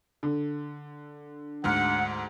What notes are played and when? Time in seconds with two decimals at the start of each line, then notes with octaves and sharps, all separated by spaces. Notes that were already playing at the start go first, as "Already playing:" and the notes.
0.23 D3
1.64 D2 G#2 F#5 F6